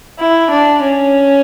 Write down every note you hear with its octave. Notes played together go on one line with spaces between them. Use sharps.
E4
D4
C#4